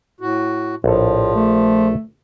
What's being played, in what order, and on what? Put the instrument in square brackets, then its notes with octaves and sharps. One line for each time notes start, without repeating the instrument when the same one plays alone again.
[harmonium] A2 F#4
[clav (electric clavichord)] A#1 A4 [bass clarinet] A2 [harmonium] F3
[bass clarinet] A3